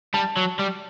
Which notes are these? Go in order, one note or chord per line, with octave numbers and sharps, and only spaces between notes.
G3 A5
F#3
G3